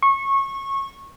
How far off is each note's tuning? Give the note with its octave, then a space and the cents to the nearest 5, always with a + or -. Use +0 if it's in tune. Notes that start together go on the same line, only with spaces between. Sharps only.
C#6 -20